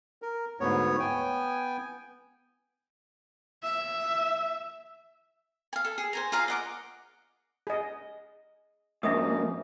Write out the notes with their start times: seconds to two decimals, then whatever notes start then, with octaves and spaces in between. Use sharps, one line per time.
0.22 A#4
0.60 D2 G#2 B3 C#5
1.00 B3 G5 G#5
3.63 E5
5.73 F5 G#5
5.85 A4
5.98 G#4
6.13 C5 G#5 A#5
6.32 F4 G#4 F5 A#5
6.48 D#5 F#5 D6
7.67 G#4 D#5
9.03 F2 G#2 A#3 E5 D#6